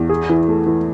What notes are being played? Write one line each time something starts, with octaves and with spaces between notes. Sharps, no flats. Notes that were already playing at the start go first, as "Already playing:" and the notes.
Already playing: E2
G#4
E3
A3
E3